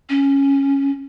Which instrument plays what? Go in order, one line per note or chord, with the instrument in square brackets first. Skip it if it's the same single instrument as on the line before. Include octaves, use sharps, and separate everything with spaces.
[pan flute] C#4